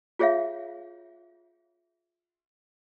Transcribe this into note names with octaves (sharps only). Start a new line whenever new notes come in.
F4 G#4 C#5 E5 F5